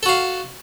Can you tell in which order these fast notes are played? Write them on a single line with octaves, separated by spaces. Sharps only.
A4 F#4 F5